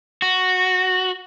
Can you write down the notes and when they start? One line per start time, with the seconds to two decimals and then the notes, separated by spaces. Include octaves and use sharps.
0.22 F#4